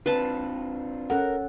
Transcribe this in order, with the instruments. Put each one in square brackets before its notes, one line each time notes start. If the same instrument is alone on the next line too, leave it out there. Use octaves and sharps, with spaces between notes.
[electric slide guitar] C4 D4 F4 [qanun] B4 A5
[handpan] C#4 A4 F#5 [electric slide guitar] A#4